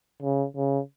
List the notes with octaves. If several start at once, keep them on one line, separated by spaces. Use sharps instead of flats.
C#3
C#3